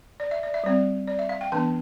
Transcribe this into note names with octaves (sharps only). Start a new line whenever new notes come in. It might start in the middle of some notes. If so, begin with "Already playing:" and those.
D5
E5
D5
E5
G3 C4 D5
D5
E5
F5
G5
E3 B3 D4 A5